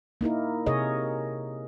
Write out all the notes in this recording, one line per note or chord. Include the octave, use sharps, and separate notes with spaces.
A#3 D#4 E4 A#4
C3 G#4 A#4 C#5 D#5